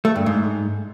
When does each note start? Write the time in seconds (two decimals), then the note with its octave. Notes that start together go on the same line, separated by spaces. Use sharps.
0.05 A3
0.16 G2
0.26 G#2